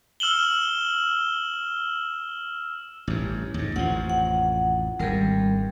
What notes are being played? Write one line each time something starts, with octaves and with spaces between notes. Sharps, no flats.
E6 F6 E7 F#7 G7
A1 G2
D#2 G#2
A1 F2 F3 F#5
F#5
G#1 G2 G3 A#4